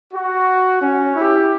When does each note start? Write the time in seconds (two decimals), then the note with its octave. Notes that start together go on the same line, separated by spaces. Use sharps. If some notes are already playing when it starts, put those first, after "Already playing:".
0.12 F#4
0.80 C#4
1.14 E4 G4